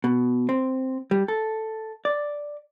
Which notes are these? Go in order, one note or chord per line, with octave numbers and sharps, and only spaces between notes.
B2
C4
G3
A4
D5